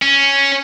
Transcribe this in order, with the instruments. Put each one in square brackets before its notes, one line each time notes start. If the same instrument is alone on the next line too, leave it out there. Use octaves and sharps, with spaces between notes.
[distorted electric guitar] C#4